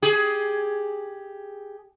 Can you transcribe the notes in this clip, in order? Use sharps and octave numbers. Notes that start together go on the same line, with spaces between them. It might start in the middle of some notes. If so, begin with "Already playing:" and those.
G4 G#4